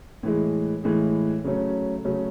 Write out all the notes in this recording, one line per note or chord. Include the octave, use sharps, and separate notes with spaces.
A2 E3 G#3
A2 E3 G#3
C#3 F#3 A3 C#4
C#3 F#3 A3 C#4